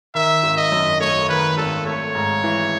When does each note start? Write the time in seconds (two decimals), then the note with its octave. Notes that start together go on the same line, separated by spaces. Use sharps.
0.15 D#3 E5
0.43 G#1
0.57 D#5
0.72 F#2
1.00 A3 C#5
1.29 D#3 B4
1.57 G#1 A4
1.86 A3 C#5
2.15 G#2
2.44 E3